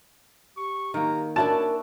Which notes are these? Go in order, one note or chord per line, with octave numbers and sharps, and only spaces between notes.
G4 C#6
D#3 A#3 A#5
C#4 D4 E4 F#4 A#4 A5